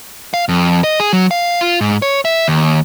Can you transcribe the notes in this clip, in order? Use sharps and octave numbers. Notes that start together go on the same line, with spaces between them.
F5
F2
D#5
G#4
F#3
F5
F4
G#2
C#5
E5
D#2